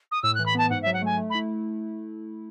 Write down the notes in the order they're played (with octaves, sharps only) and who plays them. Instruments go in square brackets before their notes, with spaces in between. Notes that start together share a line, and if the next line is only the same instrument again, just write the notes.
[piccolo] D#6
[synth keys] A2 [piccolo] E6
[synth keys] E3 [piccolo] F#6
[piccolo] B5
[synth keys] B3 [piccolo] A5
[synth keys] G#2 [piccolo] F#5
[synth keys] F#3 [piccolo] E5
[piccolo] F#5
[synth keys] A3 [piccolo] G#5
[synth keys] A3
[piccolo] B5
[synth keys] E4